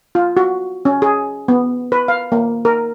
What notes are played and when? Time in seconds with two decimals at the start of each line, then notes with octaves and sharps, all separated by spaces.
0.15 F4
0.37 F#4
0.85 C#4
1.02 G#4
1.48 B3
1.92 B4
2.08 F5
2.32 A#3
2.65 A#4